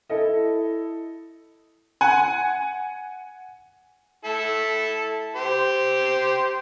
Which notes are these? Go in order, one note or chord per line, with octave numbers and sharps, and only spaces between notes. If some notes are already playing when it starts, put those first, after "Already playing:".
E4 A4 D#5
F#5 G#5
E4 A4
G4 C5